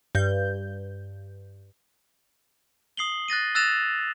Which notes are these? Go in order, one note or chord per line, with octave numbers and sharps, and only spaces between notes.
G2 G6
D#6 C7 F#7 G7
F#6 A6 A#6 D#7
E6 F#6 A6 A#6 E7 F7